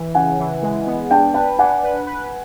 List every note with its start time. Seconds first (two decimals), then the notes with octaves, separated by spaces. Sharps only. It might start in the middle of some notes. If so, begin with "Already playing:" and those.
Already playing: E3
0.15 C#3 F#5 G#5
0.39 E3
0.63 G#3
0.87 B3
1.10 D4 G5 A5
1.34 B4 G5 A5
1.59 D4 F#5 G#5
1.83 B4
2.07 B4